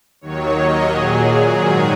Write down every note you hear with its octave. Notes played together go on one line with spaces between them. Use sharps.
D#2 D#3 F#3 C#5
D#5
A#2 F#3 G#4
G#2 D#3 F#3 G#4